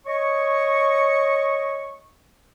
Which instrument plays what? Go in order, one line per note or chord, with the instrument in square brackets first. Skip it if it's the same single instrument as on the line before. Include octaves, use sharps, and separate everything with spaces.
[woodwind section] C#5 D#5 C#6